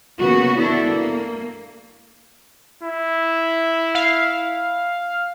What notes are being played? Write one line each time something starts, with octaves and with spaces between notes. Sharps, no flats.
C#3 A#3 B3 F#4
B3 D4 E4 A4
A#3
E4
F5